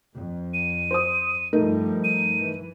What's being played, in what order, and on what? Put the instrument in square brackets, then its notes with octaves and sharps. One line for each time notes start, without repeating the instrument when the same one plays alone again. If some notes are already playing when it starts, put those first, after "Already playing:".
[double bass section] F2
[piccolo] D#7
[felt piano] C5 D#6
[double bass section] G2 F3 G3 [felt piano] A3 D#4 A#4
[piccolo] D#7
[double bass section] E3